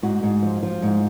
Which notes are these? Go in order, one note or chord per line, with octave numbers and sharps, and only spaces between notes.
G#2 F#4
G#2
F3
F3
G#2